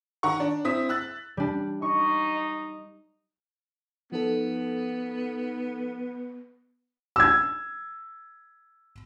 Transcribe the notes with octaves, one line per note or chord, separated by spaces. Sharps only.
D#3 F#5 A#5 C#6
D4
C4 E4 D#6 B6
E6 F#6 A6
G3 D4
D#4 C#6
F3 B3 D#4 A4
E6 G#6